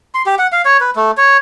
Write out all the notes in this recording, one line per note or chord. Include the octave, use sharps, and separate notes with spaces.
C6
G4
F#5
F5
C#5
B4
A3
C#5